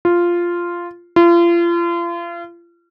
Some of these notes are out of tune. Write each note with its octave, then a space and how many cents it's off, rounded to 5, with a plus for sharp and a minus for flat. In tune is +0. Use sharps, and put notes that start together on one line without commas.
F4 -5
F4 -35